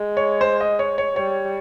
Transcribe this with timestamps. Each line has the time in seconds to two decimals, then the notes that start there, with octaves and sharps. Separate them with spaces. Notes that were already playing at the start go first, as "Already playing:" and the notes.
Already playing: G#3
0.17 C#5
0.41 C5
0.61 D#5
0.79 C#5
0.98 C#5
1.16 G3 C#5